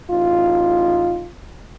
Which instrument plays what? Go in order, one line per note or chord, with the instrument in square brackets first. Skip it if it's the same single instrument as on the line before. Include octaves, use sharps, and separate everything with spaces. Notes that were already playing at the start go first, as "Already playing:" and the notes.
[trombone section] A1 D#4 F4